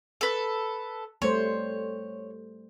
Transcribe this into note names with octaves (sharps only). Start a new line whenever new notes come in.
A4 B4
G3 A3 C5 C#5